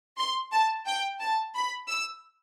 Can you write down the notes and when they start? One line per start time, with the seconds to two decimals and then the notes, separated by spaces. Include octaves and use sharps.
0.18 C6
0.52 A5
0.87 G5
1.21 A5
1.55 B5
1.89 E6